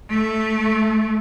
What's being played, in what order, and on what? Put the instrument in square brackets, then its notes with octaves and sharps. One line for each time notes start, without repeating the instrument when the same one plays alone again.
[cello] A3